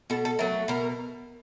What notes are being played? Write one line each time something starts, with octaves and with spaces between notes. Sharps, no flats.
B2 A4
A4
F#3 A3 A#4
B2 A#4